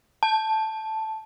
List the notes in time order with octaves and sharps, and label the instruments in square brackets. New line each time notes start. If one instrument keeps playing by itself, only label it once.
[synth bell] A5